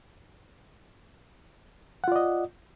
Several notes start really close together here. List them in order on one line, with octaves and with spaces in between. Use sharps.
F#5 F4 D5 D#5